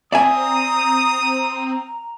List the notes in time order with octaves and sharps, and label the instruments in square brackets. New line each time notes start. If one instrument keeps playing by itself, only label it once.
[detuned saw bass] C4 [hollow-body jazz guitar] D5 E5 G#5 [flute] A#5 [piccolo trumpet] D#6